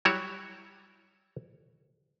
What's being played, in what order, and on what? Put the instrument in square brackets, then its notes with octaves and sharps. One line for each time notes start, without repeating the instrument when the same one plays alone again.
[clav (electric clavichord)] F#3 G3 E4 F#4 C#5 E5